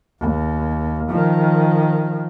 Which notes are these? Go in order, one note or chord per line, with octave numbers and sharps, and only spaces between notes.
D#2
D#3 F3